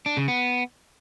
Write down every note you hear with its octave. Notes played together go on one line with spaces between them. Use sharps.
D4
C#3
B3